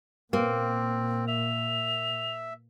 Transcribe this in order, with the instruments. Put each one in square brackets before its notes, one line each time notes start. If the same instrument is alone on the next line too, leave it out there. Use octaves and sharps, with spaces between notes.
[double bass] A#2 [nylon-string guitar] A#3 [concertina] C4
[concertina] E5 [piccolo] F7